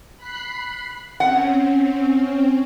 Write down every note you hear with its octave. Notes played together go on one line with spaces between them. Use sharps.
B5 F#6 C7
C4 C#4 F#5